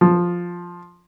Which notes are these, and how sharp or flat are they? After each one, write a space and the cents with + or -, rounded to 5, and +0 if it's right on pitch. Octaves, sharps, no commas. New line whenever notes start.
F3 +5